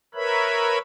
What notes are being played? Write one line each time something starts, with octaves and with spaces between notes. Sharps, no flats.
A#4 B4 C#5 E5 B5